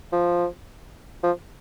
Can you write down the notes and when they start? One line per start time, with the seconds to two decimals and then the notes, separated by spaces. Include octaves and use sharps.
0.13 F3
1.23 F3